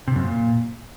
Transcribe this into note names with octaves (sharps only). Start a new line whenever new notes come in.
C3
F#2
A#2